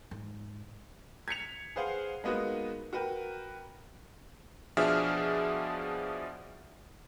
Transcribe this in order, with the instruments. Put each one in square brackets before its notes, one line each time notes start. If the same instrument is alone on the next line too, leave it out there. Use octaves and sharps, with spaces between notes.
[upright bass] G#2
[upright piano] G#6 B6 C#7 F7
G#4 B4 C5 F5 F#5
G#3 A#3 B3 D#4 F#4 B4
F#4 A#4 B4 G5
[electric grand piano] B2 F3 D4 G#4 E5 F6